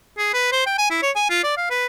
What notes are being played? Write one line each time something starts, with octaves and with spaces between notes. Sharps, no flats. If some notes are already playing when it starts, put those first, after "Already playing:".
G#4
B4
C5
G5
G#5
E4
C#5
G#5
F4
D5
F5
B4